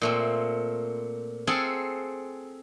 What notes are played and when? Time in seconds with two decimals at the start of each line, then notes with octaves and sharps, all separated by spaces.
0.01 A#2 A3 C4
1.47 C4 G#4 A4 F5 F#5 G#5